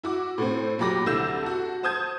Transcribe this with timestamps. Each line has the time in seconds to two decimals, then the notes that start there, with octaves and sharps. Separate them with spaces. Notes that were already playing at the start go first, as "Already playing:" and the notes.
0.04 E4 F#4 D6
0.38 A2 A3 C4
0.78 A#2 F#3 G4 B5 D6 A#6
1.06 C2 D3 E4 E6 G6 E7
1.43 F#4 A4
1.83 C5 A5 D#6 G6 G#6